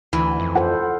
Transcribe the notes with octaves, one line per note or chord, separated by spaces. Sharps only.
D2 E3
F2
F4 A4 C5 F#5